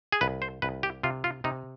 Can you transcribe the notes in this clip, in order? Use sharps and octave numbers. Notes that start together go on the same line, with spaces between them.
G#4
C2 B4
C5
C2 B4
G4
C3 F4
F4
C3 D#4